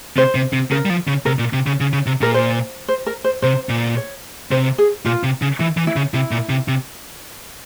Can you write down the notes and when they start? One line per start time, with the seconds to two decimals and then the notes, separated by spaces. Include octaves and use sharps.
0.17 C3 C5
0.35 C3
0.53 C3
0.71 C#3 A#4
0.85 G3
0.90 F3
1.07 C#3
1.25 C3 A#4
1.39 A#2
1.53 C3
1.66 C#3
1.80 C#3
1.93 C#3
2.06 C3
2.21 A#2 A#4
2.34 C5
2.88 C5
3.06 A#4
3.24 C5
3.42 C3 C5
3.69 A#2
3.97 C#5
4.51 C3 C5
4.78 G#4
5.05 A#2 F4
5.23 C3
5.42 C#3
5.59 E3 E4
5.77 E3
5.87 E4
5.96 C#3
6.13 C3 E4
6.31 A#2
6.49 C3
6.68 C3